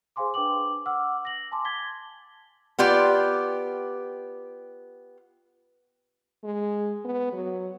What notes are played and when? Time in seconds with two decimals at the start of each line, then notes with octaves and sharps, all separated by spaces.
0.16 G#4 C5 F5 G#5 C6 D6
0.34 D4 B4 G5 D6 F#7
0.86 F#5 D6 E6 F6
1.25 A#6 F#7
1.51 G#5 A5 C6 D6
1.65 G#6 A6 B6 G7
2.79 B3 F4 G4 D5
6.44 G#3
7.05 B3
7.33 F#3